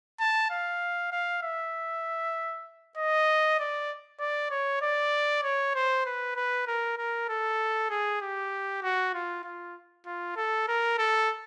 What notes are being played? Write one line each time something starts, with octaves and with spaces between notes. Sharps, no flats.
A5
F5
F5
E5
D#5
D5
D5
C#5
D5
C#5
C5
B4
B4
A#4
A#4
A4
G#4
G4
F#4
F4
F4
F4
A4
A#4
A4